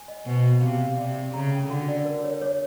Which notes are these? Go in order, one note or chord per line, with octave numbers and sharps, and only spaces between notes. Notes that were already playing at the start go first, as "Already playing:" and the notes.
Already playing: G#5
D#5
B2 C5
E5
C3 F5
F5
C3 D5
G4
C#3 A#5
G5
D3 F#4
D5
A#4
C#5
C#5